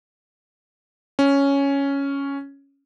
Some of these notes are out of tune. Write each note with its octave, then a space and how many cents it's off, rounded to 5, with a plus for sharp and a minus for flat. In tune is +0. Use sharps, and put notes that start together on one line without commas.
C#4 +5